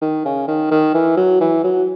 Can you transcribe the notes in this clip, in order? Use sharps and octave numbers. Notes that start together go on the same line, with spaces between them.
D#3
C#3
D#3
D#3
E3
F#3
E3
F#3